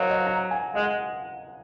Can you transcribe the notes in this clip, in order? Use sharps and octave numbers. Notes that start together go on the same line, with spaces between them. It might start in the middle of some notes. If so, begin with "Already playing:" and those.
Already playing: F#3 A#4 C5 C#5 D#5 F5
D#5 F#5
F#5 A#5
F5 G#5
G#3 D#5 F#5